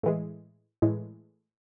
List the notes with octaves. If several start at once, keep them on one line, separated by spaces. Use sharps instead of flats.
A2 E3 G#3
A2 E3 G#3